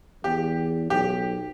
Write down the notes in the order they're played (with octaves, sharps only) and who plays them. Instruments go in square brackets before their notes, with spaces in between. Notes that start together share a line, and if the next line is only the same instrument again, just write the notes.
[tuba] E2 [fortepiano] G4
[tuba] B1 [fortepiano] G4